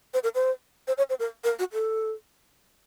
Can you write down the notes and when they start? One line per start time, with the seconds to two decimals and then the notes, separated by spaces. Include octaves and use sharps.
0.14 C5
0.23 A#4
0.35 C5
0.88 C5
0.98 C#5
1.09 C5
1.20 A#4
1.44 A#4
1.59 F#4
1.73 A4